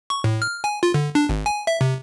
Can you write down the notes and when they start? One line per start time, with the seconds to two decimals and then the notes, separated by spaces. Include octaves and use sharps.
0.10 C#6
0.24 A2
0.42 F6
0.64 G#5
0.83 F4
0.94 D3
1.15 D4
1.29 G#1
1.46 G#5
1.67 E5
1.81 C3